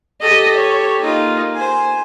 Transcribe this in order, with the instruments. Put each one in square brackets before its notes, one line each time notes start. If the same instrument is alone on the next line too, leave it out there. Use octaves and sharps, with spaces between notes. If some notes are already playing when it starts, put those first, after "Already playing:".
[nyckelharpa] G4 A4 [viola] D#5
[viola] C#5
[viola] A#3 [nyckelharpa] D#4 F4
[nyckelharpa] C5 G#5